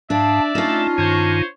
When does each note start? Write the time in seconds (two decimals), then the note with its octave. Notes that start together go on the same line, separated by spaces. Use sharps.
0.10 G#2 D4 D5 E5 F5 A5
0.55 A3 C#4 D#4 F4 A5 F6
0.98 G2 D#3 C5 C#5